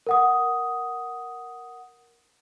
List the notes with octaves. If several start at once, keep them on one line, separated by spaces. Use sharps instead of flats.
A#4 F#5 D#6